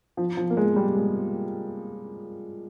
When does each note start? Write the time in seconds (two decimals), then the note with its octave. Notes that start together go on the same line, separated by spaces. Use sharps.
0.17 F3
0.37 F3
0.50 A#3
0.57 G#3
0.76 G3
0.96 G#3